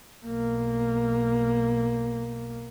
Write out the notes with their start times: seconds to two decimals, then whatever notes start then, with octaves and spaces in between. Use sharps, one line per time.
0.24 B1 A#3